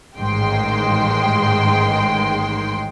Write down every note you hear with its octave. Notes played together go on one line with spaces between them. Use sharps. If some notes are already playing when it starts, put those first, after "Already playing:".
A1 G#2 D#3 G#3 G5 C6